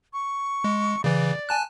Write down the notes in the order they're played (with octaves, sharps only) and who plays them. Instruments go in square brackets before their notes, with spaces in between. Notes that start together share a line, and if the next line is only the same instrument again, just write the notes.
[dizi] C#6
[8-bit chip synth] G#3
[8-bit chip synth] C#3 E3 [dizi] D5
[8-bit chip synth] G#5 A5 F#6